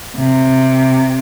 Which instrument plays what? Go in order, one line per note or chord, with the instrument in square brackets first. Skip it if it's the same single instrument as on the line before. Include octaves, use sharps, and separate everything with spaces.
[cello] C3